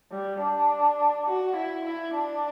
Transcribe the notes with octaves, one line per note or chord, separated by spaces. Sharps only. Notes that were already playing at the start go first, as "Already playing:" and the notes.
G3
D4
F#4
E4
E4
D4